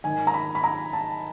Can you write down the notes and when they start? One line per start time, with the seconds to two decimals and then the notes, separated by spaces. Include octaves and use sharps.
0.04 G#2 D#3 G#5
0.27 A#5
0.34 B5
0.55 B5
0.64 A#5
0.93 A5